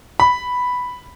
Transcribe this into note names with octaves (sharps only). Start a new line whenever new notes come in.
B5